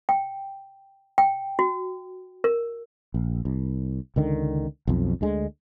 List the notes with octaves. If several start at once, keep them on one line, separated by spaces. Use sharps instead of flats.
G5
G5
F#4
A#4
A#1
C2
C#2 D3 D#3
B1 F2
D2 D3 G#3